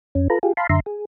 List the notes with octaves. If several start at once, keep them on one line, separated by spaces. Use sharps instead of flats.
F2 C#4
F4 A4 B4 A#5
F4 G4 G#4
F5 A5 B5 C6
F#2 D3 E5 A#5 C6
G#4